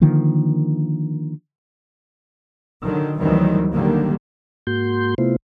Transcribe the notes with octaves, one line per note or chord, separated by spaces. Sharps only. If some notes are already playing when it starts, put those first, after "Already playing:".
D3 D#3 F3 A#3
D3 D#3 F#3
D2 D#3 E3 F#3 G3 C4
D3 D#3 F#3 G3 A#3
G#2 A#3 F#4 C6 G6
C3 A3 B3 E4 F4 C5